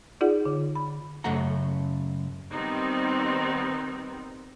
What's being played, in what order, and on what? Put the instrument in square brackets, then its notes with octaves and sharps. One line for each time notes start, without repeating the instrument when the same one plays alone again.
[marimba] D#4 F4 G#4 D5 F#5
D3
B5
[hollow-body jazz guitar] F#2 C#3 A3 A4 F#5 A#5
[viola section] D#3 G3 B3 C4 D#4